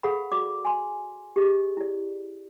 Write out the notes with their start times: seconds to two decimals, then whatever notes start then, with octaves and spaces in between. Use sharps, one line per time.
0.03 G#4 A4 B4 F5 F#5 B5
0.32 F#4 D5 D6
0.65 G#5 C6
1.36 G4 G#4 D#5
1.77 E4 D5